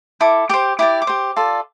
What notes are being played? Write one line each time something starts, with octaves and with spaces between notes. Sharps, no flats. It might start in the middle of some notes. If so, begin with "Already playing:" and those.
E4 A4 D6
G4 C5 D6
E4 G4 D5 D6
D6
G4 C5
F4 A4 D5